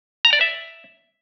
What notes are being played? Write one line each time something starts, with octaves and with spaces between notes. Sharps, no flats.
A#5
D5
E5